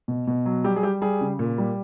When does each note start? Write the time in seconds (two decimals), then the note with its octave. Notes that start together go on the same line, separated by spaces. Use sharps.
0.08 B2
0.27 B2
0.46 F#3
0.64 G3 G4
0.76 G#4
0.83 G3 G4
1.01 G3 G#4
1.21 C#3
1.39 A#2
1.58 G3